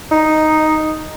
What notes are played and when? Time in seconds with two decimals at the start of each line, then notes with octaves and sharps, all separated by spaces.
0.12 D#4